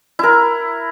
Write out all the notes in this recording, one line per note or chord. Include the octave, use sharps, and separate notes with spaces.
E4 A#4